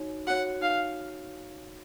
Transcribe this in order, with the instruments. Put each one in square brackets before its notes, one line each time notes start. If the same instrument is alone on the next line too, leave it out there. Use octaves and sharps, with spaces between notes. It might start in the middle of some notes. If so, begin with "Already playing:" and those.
Already playing: [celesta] D#4 F#4 C#5
[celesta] F#4 C#5 [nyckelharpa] F#5
[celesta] D#4 [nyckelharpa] F5